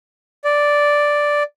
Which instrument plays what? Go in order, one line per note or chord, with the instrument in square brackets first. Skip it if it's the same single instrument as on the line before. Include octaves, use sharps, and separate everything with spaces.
[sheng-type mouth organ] D5